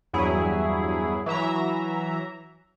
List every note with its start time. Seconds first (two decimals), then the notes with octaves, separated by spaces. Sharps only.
0.13 E2 G2 F#3 E4 G#4
1.26 E3 F#3 E5 A#5